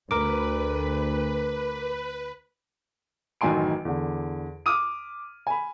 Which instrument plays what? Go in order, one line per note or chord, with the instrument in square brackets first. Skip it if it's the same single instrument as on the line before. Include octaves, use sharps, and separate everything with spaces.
[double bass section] D2 [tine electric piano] A#4 D6 [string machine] B4
[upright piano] A1 F#2 D#3 G#5 C6 D7
E2 D3
D6 D#6 F6 D#7
G#5 B5